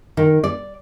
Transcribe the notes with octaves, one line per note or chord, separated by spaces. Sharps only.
D#3
D5